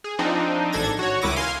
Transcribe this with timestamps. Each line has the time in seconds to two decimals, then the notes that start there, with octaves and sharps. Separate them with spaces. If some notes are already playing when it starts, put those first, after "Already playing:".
0.04 G#4
0.19 F3 C4 D4 D#4
0.72 A1 D4 A4 G#6 A#6
0.99 F#4 C#5
1.22 C#2 D#3 E4 D6 D#6 A#6
1.36 F5 G#5 C6